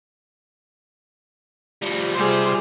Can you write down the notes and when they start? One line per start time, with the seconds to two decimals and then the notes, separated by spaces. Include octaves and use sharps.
1.82 F3 G3
2.15 C3 G3 F4 G#4 C5 C6